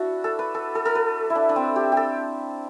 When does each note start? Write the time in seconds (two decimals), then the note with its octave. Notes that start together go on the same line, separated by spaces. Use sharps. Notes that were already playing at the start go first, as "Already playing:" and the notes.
Already playing: D4 E4 F#4
0.24 A4
0.39 B4
0.54 A4
0.75 A4
0.85 A4
0.95 B4
1.30 E4
1.35 D4
1.49 D4
1.56 C4
1.76 G4
1.92 G4 A4